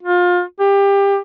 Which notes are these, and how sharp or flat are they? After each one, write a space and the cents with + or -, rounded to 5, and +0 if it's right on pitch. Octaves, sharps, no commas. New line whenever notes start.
F4 +30
G4 +25